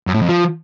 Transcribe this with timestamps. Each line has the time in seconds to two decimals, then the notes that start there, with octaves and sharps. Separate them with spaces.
0.07 F#2
0.14 A2
0.22 F2
0.29 F3